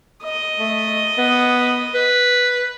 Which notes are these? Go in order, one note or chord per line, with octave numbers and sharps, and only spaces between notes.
D#5
A3
B3
B4